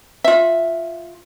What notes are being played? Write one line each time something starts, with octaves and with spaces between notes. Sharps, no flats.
F4 E5